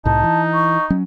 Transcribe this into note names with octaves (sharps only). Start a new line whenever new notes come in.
C2 A2 D#4 A5
E3
C#6
F#3 C#4